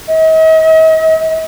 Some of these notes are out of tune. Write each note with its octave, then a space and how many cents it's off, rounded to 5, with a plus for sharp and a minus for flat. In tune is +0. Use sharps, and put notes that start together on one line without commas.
D#5 +45